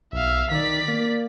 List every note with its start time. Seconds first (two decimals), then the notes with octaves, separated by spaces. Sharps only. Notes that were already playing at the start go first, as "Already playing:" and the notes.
0.13 B1 E5 F5
0.51 D#3 D5 B6
0.88 A#3